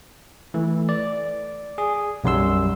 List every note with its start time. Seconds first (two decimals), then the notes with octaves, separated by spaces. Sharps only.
0.54 E3 A3
0.89 D5
1.78 G#4
2.24 B1 F#2 G3 C6 E6